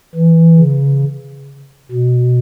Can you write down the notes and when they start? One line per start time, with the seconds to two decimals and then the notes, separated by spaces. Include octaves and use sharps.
0.15 E3
0.59 C#3
1.91 B2